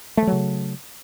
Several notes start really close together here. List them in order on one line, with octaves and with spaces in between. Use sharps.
A3 F3 F#3 C#3